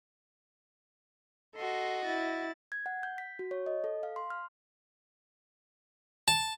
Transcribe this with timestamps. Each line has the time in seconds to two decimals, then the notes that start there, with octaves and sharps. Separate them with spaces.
1.56 F#4 A4 D#5 C6
2.05 E4 A6
2.72 G#6
2.86 F#5
3.03 G6
3.18 B6
3.39 F#4
3.51 C#5
3.66 D#5
3.84 A4
4.03 F5
4.16 C6
4.30 F6
6.28 A5